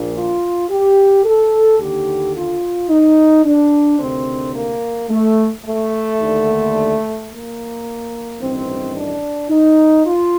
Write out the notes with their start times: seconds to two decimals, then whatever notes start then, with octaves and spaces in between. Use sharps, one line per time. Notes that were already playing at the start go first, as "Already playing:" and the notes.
Already playing: A#1 A#2
0.14 F4
0.69 G4
1.24 A4
1.79 D#2 D3 G4
2.34 F4
2.89 D#4
3.44 D4
3.99 D2 C3 D#3 C4
4.54 A#3
5.09 A3
5.64 A3
6.20 D#2 D3
7.29 A#3
8.39 A1 G2 D#3 C4
8.95 D4
9.50 D#4
10.05 F4